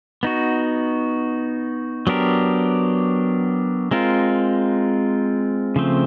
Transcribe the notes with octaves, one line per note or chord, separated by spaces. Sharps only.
B3 D#4 F#4
F#3 B3 D4 G4 A#4
G#3 C4 F4 A#4
C#3 F3 A3 C4